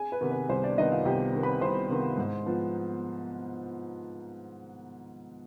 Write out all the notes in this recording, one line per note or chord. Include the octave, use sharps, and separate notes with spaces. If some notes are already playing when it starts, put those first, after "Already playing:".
Already playing: G#4 G#5
B4
C3 D#3 B3
B4
C2 C5
D4 D5
C3 D#3 B3 D#4 D#5
F4 F5
C2 G4 G5
C3 D#3 B3
B4 B5
C2 C5 C6
C3 D#3 B3
G#2
F3 B3